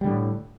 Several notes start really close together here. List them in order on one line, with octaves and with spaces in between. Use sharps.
G3 D3 A2